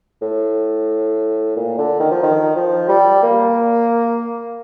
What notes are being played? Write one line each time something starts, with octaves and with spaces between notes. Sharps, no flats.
A2
A#2
D3
D#3
F3
D#3
F3
G3
A#3